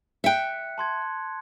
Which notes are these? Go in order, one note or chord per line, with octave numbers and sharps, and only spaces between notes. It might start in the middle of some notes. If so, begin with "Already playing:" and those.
E5 G5 F#6 C#7
A5 C6 G#6